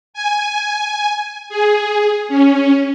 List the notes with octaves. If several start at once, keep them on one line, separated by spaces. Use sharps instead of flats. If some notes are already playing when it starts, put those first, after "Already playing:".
G#5
G#4
C#4